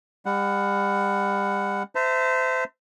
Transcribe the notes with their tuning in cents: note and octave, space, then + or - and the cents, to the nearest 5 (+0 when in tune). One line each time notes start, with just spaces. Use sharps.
G3 +35 F#5 +0
C5 -25 E5 +0 A5 +40